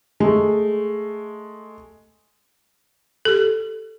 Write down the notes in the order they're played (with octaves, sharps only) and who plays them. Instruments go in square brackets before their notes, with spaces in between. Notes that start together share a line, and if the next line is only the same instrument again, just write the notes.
[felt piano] G#3 A3
[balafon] G4 A4